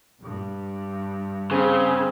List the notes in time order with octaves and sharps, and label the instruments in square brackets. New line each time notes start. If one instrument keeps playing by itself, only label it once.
[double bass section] G2
[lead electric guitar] C#3 [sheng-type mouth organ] C4 [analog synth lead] G#4